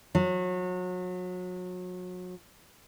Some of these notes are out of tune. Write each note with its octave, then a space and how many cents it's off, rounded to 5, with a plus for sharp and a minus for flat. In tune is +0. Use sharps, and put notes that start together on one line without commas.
F#3 -30